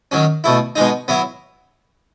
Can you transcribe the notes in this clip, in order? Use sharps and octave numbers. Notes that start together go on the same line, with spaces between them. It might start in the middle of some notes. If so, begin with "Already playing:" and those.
D#3 F#3 C#4
B2 A3 E4
B2 G#3 D#4
F#3 B3 E4